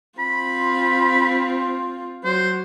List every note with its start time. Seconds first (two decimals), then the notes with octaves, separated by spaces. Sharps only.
0.19 C4 F4 B5
2.24 F#3 C5